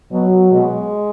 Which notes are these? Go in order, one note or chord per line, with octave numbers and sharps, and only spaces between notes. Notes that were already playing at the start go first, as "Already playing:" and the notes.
B2 F#3
B2 G#3